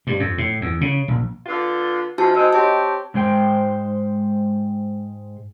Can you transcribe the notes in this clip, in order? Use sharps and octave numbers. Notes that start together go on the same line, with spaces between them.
G2
F2
A2
E2
C#3
A#1
D3 B3 F4
E3 F3 D#4 F4 F#4 A5
G#3 C4 D#4 D#5
C4 G4 C#5 A5
G#2 G#3 C5 G5